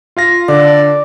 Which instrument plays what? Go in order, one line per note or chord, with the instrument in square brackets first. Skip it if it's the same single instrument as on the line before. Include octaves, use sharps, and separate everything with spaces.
[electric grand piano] F4 F5 A#6
[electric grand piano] D3 [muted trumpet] D5